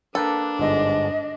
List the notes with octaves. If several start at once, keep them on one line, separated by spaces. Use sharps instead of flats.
A#3 D4 A4 B4 G5
G1 G#2 D3 D#5